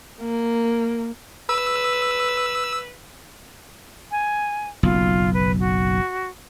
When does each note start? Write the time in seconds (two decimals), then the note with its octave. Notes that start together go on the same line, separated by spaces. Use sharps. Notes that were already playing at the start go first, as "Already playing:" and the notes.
0.21 A#3
1.49 B4 E6
4.11 G#5
4.83 F#1 B1 F4
5.34 B4
5.60 F#4